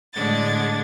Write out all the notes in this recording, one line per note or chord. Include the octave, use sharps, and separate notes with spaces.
A2 D3 G#3 D4 G#6 A6